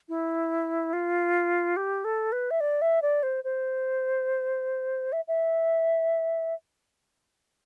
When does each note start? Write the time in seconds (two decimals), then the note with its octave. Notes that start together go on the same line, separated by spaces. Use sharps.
0.09 E4
0.93 F4
1.77 G4
2.05 A4
2.32 B4
2.51 E5
2.60 D5
2.82 E5
3.02 D5
3.23 C5
3.44 C5
5.12 E5
5.28 E5